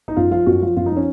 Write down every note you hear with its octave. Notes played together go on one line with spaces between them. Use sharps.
D#4
F#2 F4
F3 F4
F#2 F#4
F3 F4
F#2 F4
D#4
F3
C#4